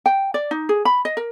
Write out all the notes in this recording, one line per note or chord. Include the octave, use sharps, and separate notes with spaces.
G5
D5
D#4
G#4
B5
D#5
A#4